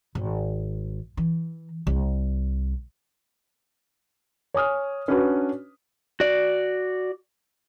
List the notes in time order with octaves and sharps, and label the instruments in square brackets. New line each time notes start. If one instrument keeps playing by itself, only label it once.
[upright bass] G#1
E3
C2
[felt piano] C#5 G#5 D#6 F6
C#4 D4 F#4 B4
[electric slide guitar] F#4 D5